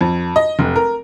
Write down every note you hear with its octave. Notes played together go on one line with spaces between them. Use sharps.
F2
D#5
F1
A#4